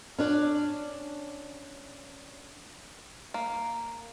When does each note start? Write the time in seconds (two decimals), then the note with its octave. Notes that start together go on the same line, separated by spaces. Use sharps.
0.18 C#4 D4 D5
3.34 A#3